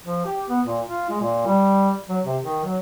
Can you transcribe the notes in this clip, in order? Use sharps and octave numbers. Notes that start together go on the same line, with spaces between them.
F3
G4
B3
A#2
F4
G#3
A#2
G3
F#3
C3
D#3
F#3